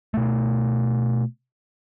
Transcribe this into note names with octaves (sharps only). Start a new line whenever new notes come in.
B2 A3